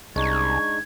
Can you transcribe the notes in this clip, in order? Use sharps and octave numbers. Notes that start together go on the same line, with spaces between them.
C2 G#3 D4 D#4 C#6 G#6